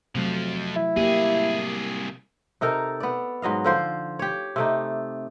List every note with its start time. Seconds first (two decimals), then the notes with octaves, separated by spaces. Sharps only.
0.15 F2 C3 F3 F#3 A3
0.76 E4
0.97 C2 A#3 G4 G#4
2.61 C3 D#4 A4 A#4
3.00 B3 D5
3.42 G#2 F#3 D#5 F5
3.64 D3 F3 C5
4.19 G4 C#5
4.56 C3 A3 D#4